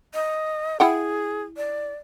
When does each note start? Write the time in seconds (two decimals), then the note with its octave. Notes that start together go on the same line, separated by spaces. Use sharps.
0.14 D#5
0.80 E4 G#4 F#5 G5
1.57 D5